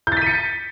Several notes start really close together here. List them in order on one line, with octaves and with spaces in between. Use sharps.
G6 A6 B6 D#7 C#7